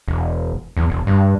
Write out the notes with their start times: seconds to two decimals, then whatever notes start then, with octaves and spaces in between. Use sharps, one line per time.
0.08 E1
0.77 E2
0.90 E1
1.07 G2